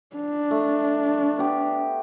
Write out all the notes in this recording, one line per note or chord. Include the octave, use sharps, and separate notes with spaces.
D4
A3
B3 G4